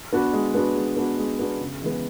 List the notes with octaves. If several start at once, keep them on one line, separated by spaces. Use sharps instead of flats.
B3 D4 F#4 B4
G#3
B3 D4 F#4 B4
G#3
B3 D4 F#4 B4
G#3
B3 D4 F#4 B4
C#3
E3 G#3 B3